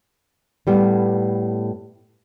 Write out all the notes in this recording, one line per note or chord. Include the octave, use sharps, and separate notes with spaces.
A2 G3 B3